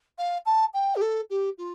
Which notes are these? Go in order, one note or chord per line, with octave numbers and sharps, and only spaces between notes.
F5
A5
G5
G4
A4
G4
F4